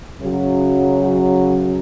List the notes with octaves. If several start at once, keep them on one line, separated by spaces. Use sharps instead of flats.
F#2 C#3 F#3